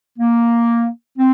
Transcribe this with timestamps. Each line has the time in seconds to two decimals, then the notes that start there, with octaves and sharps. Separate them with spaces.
0.19 A#3
1.18 C4